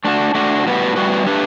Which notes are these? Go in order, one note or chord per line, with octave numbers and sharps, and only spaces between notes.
A3 D4 F#4
A3 D4 F#4
A2 G3 B3 F#4 B4
A2 G3 B3 F#4 B4
A3 D4 G4 B4